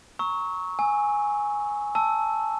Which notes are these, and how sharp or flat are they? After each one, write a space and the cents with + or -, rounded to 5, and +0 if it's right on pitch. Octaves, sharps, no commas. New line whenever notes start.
A#5 +0 C#6 +0 E6 -40
G#5 +0 E6 -15
A5 +5 E6 +0